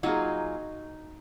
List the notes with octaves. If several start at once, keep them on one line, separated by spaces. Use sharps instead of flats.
F#3 A#3 D#4 F4 F#4 G#4